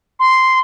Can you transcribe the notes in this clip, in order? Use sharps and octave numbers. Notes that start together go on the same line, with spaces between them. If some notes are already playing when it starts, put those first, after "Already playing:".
C6